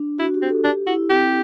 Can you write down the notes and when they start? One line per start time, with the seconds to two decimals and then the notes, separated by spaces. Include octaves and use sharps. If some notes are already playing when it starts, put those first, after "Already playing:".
Already playing: D4
0.19 E4 F#4
0.34 G4
0.42 C4
0.49 A4
0.64 D4 G4
0.87 E4 F#4
1.10 C4 G4